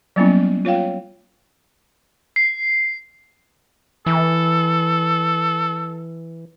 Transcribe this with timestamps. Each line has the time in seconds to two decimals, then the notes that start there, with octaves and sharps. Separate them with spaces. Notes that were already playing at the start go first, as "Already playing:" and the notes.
0.16 F#3 G3 A#3 B3 C#4 E4
0.65 F4 C#5 F5 G5
2.36 C7
4.06 E3 A4